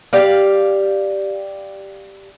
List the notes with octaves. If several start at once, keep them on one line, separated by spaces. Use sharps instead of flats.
G4 D5 F5